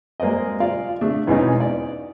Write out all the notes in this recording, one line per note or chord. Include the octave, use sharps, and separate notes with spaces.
G#3 A#3 C4 D5 D#5
F4 D5 F5
A3 D4
E2 B2 E3 G#3 C#4 D#4
D5